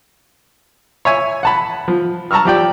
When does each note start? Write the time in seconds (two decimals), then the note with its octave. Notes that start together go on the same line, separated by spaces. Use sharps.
1.05 C#5 E5 G#5
1.43 F#5 A5 B5
1.88 F3
2.31 A5 A#5 C#6 E6 F6
2.45 F3 G4 D5 G5